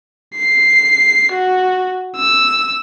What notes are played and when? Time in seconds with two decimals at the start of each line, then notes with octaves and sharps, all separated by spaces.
0.36 C7
1.32 F#4
2.16 E6